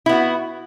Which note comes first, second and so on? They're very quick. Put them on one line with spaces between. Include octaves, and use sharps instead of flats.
E4 B3 F#4